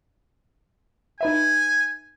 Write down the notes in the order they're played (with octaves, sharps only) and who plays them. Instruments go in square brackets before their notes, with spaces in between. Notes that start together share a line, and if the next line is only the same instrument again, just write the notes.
[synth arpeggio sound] D#4 B4 E5 [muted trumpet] G#5